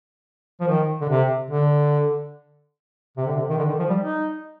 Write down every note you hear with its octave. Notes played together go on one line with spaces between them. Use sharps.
F3
D#3
D3
C3
D3
C3
D3
C3
D#3
D3
D#3
F3
G3
D#4